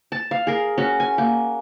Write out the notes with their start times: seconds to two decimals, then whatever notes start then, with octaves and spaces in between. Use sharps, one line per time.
0.12 A5
0.31 F5
0.47 G#4 A#4
0.78 C#4 F#4
1.00 G#5
1.18 A#3